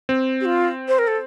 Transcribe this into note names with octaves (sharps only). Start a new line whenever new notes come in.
C4
G4
F4
C5
A#4
A4